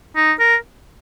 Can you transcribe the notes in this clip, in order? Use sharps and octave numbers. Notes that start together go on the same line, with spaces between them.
D#4
A#4